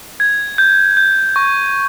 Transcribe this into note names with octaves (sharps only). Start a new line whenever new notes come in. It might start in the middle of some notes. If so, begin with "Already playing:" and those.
G#6
G6
G6
C#6